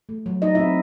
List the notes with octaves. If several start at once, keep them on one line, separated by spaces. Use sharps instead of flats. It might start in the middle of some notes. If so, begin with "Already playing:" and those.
A3
F#3
F#3 D#4 D#5
E4 E5
C4